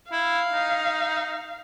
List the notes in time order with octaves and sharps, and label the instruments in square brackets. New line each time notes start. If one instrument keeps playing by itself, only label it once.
[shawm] E4 [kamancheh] F5
[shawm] D#4